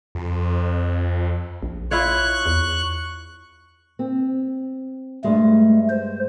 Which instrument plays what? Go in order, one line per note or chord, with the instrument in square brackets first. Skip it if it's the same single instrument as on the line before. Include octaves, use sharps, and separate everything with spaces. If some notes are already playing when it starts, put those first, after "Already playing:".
[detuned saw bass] F2
[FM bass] A#1
[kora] E4 F4 C#5 [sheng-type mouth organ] C#6 F#6
[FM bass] E2
[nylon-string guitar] C4
[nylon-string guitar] G2 G#3 [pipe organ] A3
[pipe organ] C5